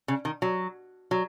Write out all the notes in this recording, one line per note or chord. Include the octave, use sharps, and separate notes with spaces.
C#3
D#3
F#3
F#3